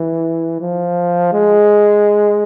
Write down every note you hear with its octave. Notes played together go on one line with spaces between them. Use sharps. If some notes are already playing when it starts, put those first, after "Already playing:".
Already playing: E3
F3
G#3